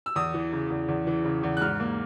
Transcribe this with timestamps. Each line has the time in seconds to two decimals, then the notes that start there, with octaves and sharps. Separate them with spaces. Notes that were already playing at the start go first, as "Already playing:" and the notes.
0.06 E6
0.16 E2 D#6
0.34 E3
0.52 C#3
0.70 E2
0.88 E2
1.07 E3
1.25 C#3
1.43 E2
1.57 F#6
1.61 G#2 F6
1.80 A#3